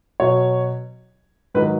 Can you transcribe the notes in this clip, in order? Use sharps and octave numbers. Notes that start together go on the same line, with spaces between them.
B2 F#3 C#5
G#2 D#3 F#3 B4